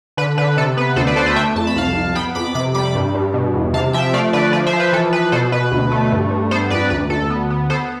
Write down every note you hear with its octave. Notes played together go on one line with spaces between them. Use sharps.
D3 B4
D3 B4
C3 A4
B3 B4
D2 A4 C5
B4 D5
D3 A4 C5
B4
A3 E5 G5
F2 A5
B5
C2 F5 A5
C2
B3 G5 B5
F2 B5 D6
C3 B5 D6
G3 B5 D6
G2
G2
B2
E2
C3 F5 A5
F3 E5 G5
A3 D5 F5
D3 B4 D5
F3 B4 D5
C5 E5
F3
B4
E3 A4
E3 B4
B2 A4 C5
B2 B4
D2
A3
G2
G2
B3 A4 C5
F2 B4 D5
D2 B4
D2 A4
B3
B3
B3 A4 C5